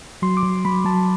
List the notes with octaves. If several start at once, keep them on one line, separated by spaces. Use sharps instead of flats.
F#3 C6
D6
F#3
F#3 B5
F#3 A5